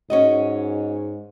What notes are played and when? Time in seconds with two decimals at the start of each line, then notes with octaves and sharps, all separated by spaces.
0.10 G#2 C#4 F#4 D#5